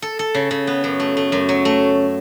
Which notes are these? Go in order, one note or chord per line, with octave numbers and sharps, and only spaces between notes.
A4
A4
C#3
C#3
B3
F#2
A3
A3
F#2
F#3
A3